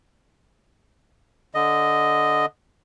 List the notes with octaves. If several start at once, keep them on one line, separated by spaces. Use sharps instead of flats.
D3 D#5